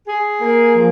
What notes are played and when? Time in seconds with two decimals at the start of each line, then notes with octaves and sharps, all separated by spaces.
0.07 G#4
0.40 A#3
0.74 F3